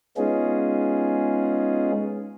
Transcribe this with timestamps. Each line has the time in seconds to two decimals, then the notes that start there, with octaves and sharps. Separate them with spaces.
0.17 G#3 B3 C#4 D#4 F4 G#4